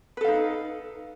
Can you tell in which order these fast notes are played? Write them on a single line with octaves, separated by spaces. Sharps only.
B4 A4 F5 D#4